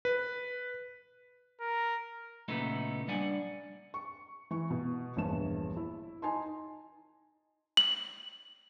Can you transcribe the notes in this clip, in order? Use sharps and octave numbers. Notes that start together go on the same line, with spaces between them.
B4
A#4
A#2 C#3 A3 B3 D#4 E4
G3 D4 D5 F#5 G#5
C#6
E3 C#6
B2
E1 A#1 G2 A5 E7
E4
D#4 G#5 A5 C6
F#7